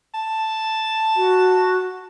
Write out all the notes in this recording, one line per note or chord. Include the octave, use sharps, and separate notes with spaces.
A5
F#4